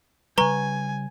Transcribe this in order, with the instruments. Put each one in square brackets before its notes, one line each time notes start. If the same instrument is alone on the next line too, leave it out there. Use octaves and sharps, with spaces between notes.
[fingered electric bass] C#3 G3 [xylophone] B4 A#5 C#6 [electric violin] G#5